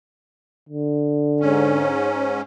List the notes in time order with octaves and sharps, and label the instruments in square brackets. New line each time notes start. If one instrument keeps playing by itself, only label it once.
[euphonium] D3
[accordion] G#2 C#4